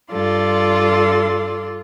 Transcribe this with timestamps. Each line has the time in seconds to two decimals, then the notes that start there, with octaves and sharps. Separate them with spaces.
0.11 G2 F4 A4 D5 C6